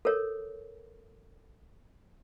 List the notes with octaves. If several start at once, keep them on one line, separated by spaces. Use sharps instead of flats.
A4 A#4 C#5